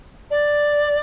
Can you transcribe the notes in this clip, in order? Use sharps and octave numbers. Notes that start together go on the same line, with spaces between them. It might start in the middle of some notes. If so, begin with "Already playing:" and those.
D5